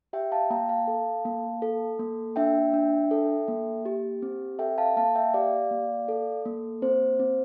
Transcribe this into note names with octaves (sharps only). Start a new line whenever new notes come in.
G4 E5 G5
F5 A5
A#3 G5 A#5
F5 A5
A4
A#3
A4
A#3
D4 E5 G5
D4
A4
A#3
G4
C4
A4 E5 G5
F5 A5
A#3 F5 A5
E5 G5
G4 D5 F5
A#3
A4
A#3
C4 C5
C4